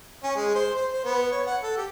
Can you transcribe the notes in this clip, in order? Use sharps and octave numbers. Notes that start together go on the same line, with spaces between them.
C#4
G#3
C5
C5
C5
B3
C#5
F#5
A4
G4